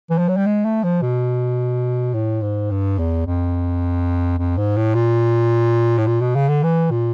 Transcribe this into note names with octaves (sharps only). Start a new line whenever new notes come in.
E3
F3
F#3
G3
G#3
A3
F3
B2
A2
G#2
G2
E2
F2
F2
G#2
A2
A#2
A2
A#2
B2
C#3
D3
E3
A#2